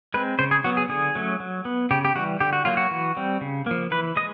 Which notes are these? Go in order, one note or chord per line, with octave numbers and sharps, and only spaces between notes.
G#3 C4 B4
C#3 C5
G#4
F#3 B3 F#4
G#4
D3 G#4
F#3 A3 C#4
F#3
B3
C#3 G4
G4
E3 G3 F#4
D3 G4
F#4
F#3 A#3 F4
F#4
E3
G3 C4
C#3
F3 A#3
E3 B4
G#3 D#5